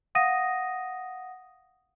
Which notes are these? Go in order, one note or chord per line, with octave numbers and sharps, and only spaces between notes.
F5 F#5 D#6 A#6 D#7